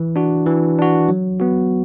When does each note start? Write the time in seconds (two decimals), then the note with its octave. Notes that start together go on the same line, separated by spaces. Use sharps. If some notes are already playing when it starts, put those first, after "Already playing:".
Already playing: E3
0.16 D4 F#4
0.46 E3
0.79 D4 F#4
1.09 F#3
1.40 B3 F#4